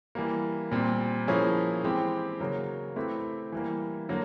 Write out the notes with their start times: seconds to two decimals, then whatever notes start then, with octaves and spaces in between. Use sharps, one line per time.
0.15 E3 G3 A#3
0.71 A#2 G3 C4
1.28 F3 A#3 C#4 E4 G#4
1.83 E3 G#3 C4 E4 G4
2.40 C#3 F#3 A#3
2.96 A3 C4 E4 G4 B4
3.52 E3 G3 A#3
4.09 D3 F#3 A#3